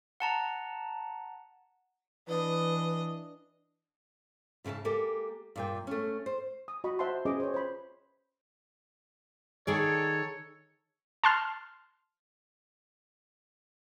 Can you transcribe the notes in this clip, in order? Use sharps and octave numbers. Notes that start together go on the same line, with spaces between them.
F#5 A5 A#5
E3 D4 B4 D#5
G#2 C#3 E4 E5 A5
G#3 A#3 G4 A4
G2 A#2 G5
A3 C#4
C5
D#6
F#4 D#5 B5 C#6
C5 E5 F#5 A5 B5 C6
C#4 F4 G#4 B4 D#5 D6
C5 C#5
C5 B5
D#3 G#4 A4 C#5 D5
A5 C6 F6